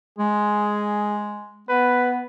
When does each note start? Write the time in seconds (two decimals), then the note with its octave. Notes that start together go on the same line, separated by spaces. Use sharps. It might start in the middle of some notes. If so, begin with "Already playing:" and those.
0.19 G#3 G#4
1.69 B3 B4